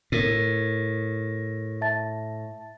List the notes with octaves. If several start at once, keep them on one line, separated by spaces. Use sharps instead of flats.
A2 A#4 D#7
E5 A5 A6